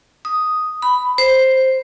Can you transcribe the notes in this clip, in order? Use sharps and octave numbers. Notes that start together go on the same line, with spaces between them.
D#6
B5
C5